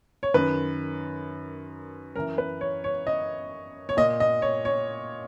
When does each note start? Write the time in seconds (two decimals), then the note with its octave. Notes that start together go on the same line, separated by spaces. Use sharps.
0.23 C#5
0.34 F#2 D#3 B4
2.15 F#2 A#4
2.19 E3
2.38 B4
2.61 C#5
2.84 C#5
3.07 D#5
3.89 C#5
3.97 A#2 D#5
4.20 D#5
4.42 C#5
4.65 C#5